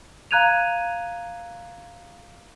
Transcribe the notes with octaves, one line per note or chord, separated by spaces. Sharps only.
F5 A#5 F#6 G#6 D#7 F7